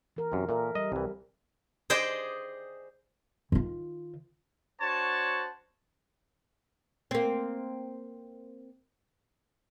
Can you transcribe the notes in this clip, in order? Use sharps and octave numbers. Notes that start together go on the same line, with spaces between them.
E3 A#4
F#2 C3
A#2 A4 A#4 E5
G3 D#5
C2 E3
G#4 C5 D5 D#5 G5
D#3 F4
D4 F#4 C5 C#5 A5
A#3 C4